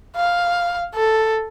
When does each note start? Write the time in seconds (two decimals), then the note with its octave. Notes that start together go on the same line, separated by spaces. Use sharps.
0.16 F5
0.95 A4